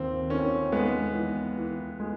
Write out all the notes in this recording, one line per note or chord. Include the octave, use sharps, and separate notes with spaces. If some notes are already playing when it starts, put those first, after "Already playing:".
Already playing: D#2 D#3 C4
D#3 C#4
G#3 B3
E3
E3
G#3